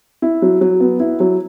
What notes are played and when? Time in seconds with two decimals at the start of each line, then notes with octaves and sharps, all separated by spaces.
0.22 E4
0.42 F#3
0.61 F#3
0.80 B3
1.00 E4
1.20 F#3